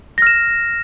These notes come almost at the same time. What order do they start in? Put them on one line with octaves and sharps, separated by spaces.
A#6 F6 E7